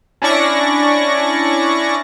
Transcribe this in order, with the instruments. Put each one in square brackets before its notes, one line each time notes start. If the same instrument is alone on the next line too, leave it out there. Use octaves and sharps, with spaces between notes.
[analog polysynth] C#4 D4 E4 D5 C#6 A#6